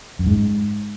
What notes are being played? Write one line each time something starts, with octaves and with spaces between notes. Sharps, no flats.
F#2
G#2